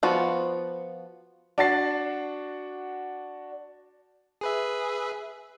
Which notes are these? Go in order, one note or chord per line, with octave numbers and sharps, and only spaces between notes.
F3 B3 F4 F#4
D4 F#4 F#5 A5 A6 C7
G#4 B4 E5